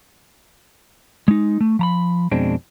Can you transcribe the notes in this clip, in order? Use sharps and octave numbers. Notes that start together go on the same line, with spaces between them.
G#3 D#4
A3
F3 A#5 B5
F2 B2 G#3 C4 D4